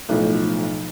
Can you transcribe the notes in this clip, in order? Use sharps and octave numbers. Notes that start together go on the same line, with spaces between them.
B1 A2 F3